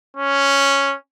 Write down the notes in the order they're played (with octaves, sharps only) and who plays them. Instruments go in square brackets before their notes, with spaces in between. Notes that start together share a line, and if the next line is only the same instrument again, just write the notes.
[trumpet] C#4